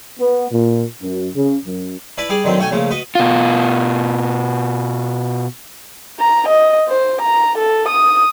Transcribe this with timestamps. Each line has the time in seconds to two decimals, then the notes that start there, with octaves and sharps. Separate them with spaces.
0.20 B3
0.51 A#2
1.02 F#2
1.35 C#3
1.66 F#2
2.18 E4 B4 D5 A5 B5
2.29 G3 G#4 D5 D6
2.44 D3 D#3 F#3 C4
2.58 B1 A3 F#4 G5 G#5
2.71 A#1 C#3 F3 A3
2.91 F#4 B4 D#5
3.15 B2 F4
6.19 A#5
6.48 D#5
6.89 C5
7.21 A#5
7.58 A4
7.88 D#6